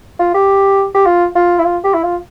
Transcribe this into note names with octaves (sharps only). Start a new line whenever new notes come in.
F4
G4
G4
F4
F4
E4
F4
G4
E4
F4